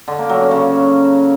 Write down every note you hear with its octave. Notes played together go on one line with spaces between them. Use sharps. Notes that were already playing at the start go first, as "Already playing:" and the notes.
D3
A#3
F#3
C#4
C#3